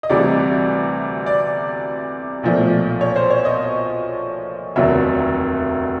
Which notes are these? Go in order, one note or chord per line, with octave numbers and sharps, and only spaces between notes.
D#5
D2 C3 E3 G3 D5
D5
B1 A#2 F3 A3
C#5
C5
C#5
D#5
F1 D#2 D3 F#3 E5